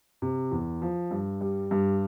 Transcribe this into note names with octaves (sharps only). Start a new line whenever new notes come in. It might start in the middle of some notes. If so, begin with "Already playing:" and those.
C3
E2
F3
G2
G3
G2